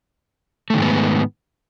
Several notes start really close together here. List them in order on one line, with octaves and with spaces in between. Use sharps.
A3 D#3 G#2 B3